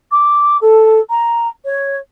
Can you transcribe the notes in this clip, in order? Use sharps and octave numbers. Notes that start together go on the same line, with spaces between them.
D6
A4
A#5
C#5